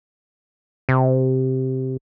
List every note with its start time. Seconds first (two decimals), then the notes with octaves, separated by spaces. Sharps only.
0.89 C3